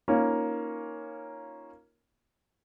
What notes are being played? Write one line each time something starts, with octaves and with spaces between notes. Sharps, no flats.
A#3 C#4 D#4 F4